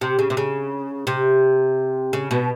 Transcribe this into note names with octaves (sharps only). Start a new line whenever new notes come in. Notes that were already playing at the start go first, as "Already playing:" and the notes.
C3
C#3
C3
C#3
C3
C#3
B2